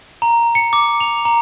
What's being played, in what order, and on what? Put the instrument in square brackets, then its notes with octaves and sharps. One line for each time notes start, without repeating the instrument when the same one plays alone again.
[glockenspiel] A#5
C#7
D6
F7
A#5